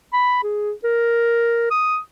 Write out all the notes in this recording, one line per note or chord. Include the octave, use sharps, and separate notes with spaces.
B5
G#4
A#4
D#6